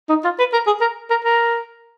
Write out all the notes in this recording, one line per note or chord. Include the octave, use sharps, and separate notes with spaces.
D#4
F4
B4
A#4
G#4
A#4
A#4
A#4